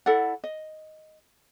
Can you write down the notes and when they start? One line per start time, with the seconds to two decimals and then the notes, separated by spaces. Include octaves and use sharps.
0.06 E4 A4 D5 F#5
0.44 D#5